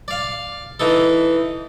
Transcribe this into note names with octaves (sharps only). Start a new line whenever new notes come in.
D5 F5
E3 D#4 A4